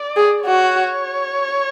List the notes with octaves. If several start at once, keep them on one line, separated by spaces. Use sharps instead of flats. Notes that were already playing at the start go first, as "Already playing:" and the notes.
Already playing: D5
G#4
F#4 C#5